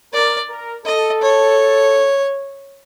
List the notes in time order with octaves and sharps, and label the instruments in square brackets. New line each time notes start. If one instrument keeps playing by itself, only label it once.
[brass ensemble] A#4 [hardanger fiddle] D5
[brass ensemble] A#4
[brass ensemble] A4 [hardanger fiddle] D#5
[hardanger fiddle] C#5